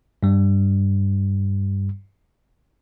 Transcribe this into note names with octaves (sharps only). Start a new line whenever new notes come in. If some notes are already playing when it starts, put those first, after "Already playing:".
G2 G3